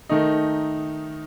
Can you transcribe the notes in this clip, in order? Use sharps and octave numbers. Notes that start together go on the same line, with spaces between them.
D#3 A3 D#4